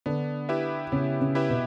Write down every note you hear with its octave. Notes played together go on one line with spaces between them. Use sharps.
D3 B3 D4
E4 G4 B4 E5
C#3 B3 C#4
C#3 C#4
E4 G4 B4 E5
B2 B3